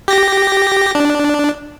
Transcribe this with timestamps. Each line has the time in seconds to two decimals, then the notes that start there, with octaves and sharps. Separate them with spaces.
0.08 G4 A#6
0.95 D4